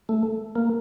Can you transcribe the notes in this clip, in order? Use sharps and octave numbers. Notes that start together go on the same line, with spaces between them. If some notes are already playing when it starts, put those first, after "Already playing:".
A3
A#3